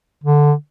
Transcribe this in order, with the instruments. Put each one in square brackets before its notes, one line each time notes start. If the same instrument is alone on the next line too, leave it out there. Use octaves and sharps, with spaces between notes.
[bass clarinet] D3